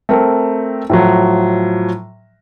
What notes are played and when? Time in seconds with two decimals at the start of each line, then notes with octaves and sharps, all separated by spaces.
0.09 A3 C4 A#4
0.90 A2 F3 F#3